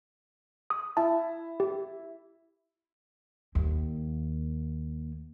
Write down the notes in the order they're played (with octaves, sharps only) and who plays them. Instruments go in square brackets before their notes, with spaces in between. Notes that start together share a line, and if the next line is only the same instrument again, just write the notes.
[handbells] D#6
[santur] E4 [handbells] A5
[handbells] G4
[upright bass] D#2 A#3